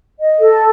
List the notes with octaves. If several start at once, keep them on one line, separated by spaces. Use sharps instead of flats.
D#5
A4